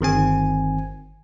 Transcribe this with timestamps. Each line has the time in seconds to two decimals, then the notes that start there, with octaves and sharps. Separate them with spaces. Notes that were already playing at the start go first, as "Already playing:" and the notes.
0.01 G1 D#3 C4 G#5